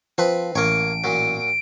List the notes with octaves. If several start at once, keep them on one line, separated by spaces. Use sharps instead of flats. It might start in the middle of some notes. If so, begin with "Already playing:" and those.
F3 C4 B4
A1 A#3 C#5 D7
A#2 F#3